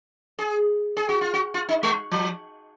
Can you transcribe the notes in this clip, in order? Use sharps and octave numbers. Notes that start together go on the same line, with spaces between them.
G#4
G#4
F#4
F4
F#4
F4
D#4
G#3
F3